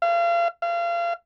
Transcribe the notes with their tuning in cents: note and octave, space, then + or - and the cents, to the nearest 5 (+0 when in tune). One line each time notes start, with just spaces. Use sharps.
F5 -35
F5 -30